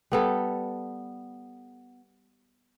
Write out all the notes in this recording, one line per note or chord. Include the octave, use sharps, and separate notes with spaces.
G3 B3 A4